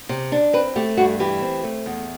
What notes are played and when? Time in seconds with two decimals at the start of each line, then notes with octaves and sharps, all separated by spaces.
0.09 C3
0.32 D4
0.53 C4 B4
0.76 A3 G4
0.97 G2 F#4
1.20 E3 G4
1.42 C4
1.64 A3
1.86 E2